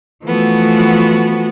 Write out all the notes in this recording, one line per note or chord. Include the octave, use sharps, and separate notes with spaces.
E3 F3 A3 B3 F#4